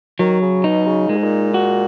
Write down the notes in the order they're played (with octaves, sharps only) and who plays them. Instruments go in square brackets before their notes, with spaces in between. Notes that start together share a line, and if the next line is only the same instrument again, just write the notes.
[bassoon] D#3 [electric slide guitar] F#3
[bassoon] C#3
[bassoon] B2 [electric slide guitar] D#4
[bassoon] C#3
[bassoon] A#2 [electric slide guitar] G#3
[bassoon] G#2
A#2
[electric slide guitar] F#4